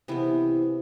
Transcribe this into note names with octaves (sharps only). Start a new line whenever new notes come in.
C3 E3 G#3 B3 E4